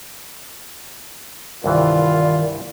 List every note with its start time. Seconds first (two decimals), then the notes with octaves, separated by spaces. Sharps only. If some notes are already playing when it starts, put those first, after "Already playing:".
1.64 C2 G2 D#3 E3 F4 D5